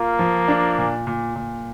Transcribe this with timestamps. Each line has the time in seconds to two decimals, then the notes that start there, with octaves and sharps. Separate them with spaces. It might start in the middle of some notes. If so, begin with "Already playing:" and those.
Already playing: A#3 F4
0.19 F3
0.48 D4
0.78 A#2
1.07 A#2
1.36 A#2